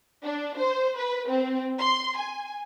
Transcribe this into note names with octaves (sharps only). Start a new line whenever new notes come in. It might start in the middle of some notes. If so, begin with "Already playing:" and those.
D4
C5
B4
C4
C6
G#5